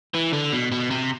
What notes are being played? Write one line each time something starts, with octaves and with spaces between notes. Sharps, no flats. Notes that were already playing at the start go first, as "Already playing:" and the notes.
E3
D3
B2
B2
C3